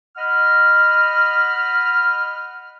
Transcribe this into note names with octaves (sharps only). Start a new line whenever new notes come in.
D#5 F#5 B5 F6